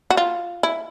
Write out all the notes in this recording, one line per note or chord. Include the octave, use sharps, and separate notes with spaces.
F#4
F4
E4